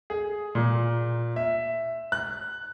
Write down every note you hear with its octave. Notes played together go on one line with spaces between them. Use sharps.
G#4
A#2
E5
F#6